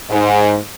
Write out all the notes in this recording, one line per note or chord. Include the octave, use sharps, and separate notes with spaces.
G#2